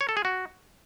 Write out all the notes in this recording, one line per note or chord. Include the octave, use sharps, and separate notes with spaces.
C#5
A4
G#4
F#4